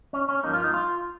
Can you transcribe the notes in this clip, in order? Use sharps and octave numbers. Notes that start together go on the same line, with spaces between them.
C#4
C#4
G2 F3 A#3 D#4
F4
D#4
F4